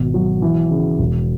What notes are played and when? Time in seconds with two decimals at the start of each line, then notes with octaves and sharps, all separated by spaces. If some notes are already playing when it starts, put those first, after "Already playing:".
Already playing: G#1 B2
0.14 F#3
0.42 E3
0.71 C#3
0.99 E1